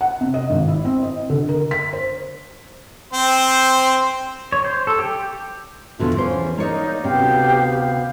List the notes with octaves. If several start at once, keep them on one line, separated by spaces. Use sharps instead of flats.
F#5
C3
D#5
G#1
E4
C4
D#5
D3
A#4
B6
C5
C4 C5
C#5
C5
A4
G4
E2 B2 D3 A3 F4
E2 E3 C#4 C5
A#3 D#4 C#5 D5
D2 C3 B3 C#4 G4 F5